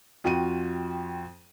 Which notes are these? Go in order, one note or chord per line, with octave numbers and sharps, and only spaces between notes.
F2 F4 F#4 G5 D#7